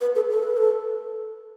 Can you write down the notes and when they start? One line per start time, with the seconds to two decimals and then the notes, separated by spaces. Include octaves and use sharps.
0.01 B4
0.15 A4
0.30 A4
0.43 B4
0.57 A4